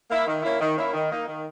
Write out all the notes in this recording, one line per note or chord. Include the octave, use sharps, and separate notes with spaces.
A#3 E4
D#3
A#3 C#4 E4
D#3
A#3 C#4 E4
D#3
A#3 D#4
D#3